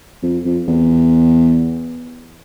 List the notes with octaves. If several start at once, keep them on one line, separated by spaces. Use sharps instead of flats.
F2
F2
E2